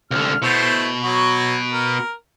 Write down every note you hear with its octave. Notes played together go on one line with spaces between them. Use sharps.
C2 D3 F6
B2 A3 E4 C5
F#3 F#4
A#4